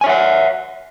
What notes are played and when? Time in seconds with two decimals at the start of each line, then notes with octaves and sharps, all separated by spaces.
0.01 G#5
0.04 C#5
0.07 E5
0.09 F#5